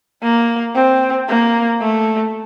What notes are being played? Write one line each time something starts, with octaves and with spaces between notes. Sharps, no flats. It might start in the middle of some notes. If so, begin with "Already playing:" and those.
A#3
C4
A#3
A3